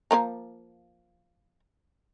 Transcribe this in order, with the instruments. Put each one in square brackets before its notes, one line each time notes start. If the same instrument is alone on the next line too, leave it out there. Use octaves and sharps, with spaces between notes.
[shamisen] F3 A#3 A#5